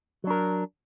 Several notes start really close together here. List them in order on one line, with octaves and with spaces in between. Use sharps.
F#3 D4 A#4